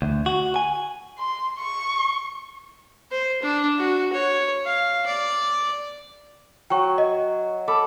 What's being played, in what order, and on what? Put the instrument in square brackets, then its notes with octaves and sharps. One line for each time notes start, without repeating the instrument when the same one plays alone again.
[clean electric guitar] D2
F#4
G#5
[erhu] C6
C#6
[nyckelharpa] C5
D4
F#4
C#5
F5
D5
[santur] F#3 [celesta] G5 C#6
[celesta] D#5
[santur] A4 B5 D6